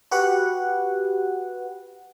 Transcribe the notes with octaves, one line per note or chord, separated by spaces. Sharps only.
F#4 G4 B4 F#5